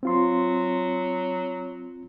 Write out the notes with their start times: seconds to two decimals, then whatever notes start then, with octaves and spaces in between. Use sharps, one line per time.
0.03 F#3 C4 F4 C6